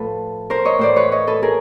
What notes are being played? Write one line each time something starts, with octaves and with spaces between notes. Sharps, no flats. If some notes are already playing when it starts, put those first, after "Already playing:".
Already playing: A2 F3 A4 B4
A#4 C5
C#5 D#5
A2 E3 C5 D5
B4 C#5
C#5 D#5
A4 B4
G#4 A#4